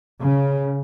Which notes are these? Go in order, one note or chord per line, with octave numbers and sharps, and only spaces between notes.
C#3